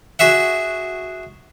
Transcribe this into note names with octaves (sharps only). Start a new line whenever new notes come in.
F#4 G#4 E5 F#5